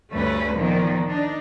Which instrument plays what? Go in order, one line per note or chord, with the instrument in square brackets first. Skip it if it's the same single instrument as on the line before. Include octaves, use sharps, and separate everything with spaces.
[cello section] D2 G2 A3 C#4 B4
A#2 D#3 F3 B3
D4 D#4